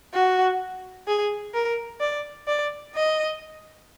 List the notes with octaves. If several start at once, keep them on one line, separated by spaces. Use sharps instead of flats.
F#4
G#4
A#4
D5
D5
D#5